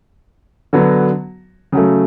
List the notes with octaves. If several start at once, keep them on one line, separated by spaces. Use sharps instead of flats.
D3 F#3 B3 F#4
C#3 F#3 A3